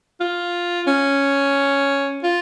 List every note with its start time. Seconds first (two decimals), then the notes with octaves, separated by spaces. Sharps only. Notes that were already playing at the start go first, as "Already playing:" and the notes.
0.20 F4
0.87 C#4
2.23 F4